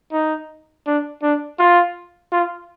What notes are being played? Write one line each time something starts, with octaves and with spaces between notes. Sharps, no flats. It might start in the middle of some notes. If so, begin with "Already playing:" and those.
D#4
D4
D4
F4
F4